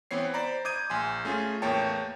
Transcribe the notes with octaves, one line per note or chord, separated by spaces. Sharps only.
E3 B3 C4 C#5 C7
C5 D5 A#5 B5
D6 D#6 G6 G#6 D#7
A#1 G#5 C6
A3 C#4 F4 G#4
E2 A2 A#3 C#5 G5 A5